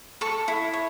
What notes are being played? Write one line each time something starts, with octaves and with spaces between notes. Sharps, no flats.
A4 A5 C#6
E4
C#5